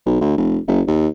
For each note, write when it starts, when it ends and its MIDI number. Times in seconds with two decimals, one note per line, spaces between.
0.06 0.18 35
0.21 0.34 38
0.37 0.58 29
0.67 0.81 30
0.87 1.07 39